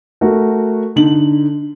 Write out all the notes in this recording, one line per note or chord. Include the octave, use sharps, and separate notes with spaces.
A3 F#4 A#4
D3 D#4 F#7